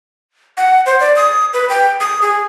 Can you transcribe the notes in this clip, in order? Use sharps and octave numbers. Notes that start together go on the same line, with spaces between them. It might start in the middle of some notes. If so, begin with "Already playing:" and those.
F#5
C5
D5
D#6
B4
G5
D#6
G#4